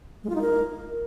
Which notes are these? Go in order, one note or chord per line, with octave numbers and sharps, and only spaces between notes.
G#3
F4
D#4
A#4